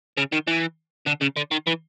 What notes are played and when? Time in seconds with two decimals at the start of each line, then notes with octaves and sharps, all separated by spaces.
0.18 C#3
0.33 D#3
0.48 E3
1.07 D3
1.22 C#3
1.37 D3
1.51 D#3
1.67 E3